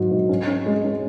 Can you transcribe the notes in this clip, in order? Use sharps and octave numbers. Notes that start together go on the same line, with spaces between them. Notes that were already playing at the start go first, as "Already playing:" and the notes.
Already playing: G#2 D#3 F#3
G#2
C#4
C#4
G#3
C#4